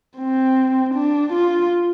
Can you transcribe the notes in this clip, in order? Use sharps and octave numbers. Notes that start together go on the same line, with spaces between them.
C4
D4
F4